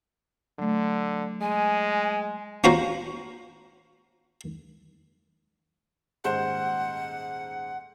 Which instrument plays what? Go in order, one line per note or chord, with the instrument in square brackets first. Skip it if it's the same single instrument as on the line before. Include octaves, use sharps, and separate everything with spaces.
[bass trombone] D3 [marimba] F#3 A3
[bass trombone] G#3 [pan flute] G#5
[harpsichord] C#4 F4 F#4 C5 A#5
[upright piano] D#1 G#2 C5 [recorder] F#5